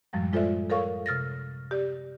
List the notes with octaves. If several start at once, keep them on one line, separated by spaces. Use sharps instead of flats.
F#2 A2 F3 G3 G#3
G#3 F4 A4 C5 D5 E5
A4 A#4 C#5 F5 C#6
C3 F6 A6 A#6
G4 D5